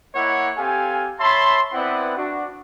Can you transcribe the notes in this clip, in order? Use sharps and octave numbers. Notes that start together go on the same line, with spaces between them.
A#3 E4 C#5 D#5 F#5
C4 G4 A4 F5 G#5
C#5 E5 A5 B5 C6
B3 C4 E4 B4 D5 F#5
D4 F#4